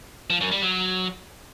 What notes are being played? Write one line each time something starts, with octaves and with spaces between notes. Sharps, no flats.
F3
F#2
G3
F#3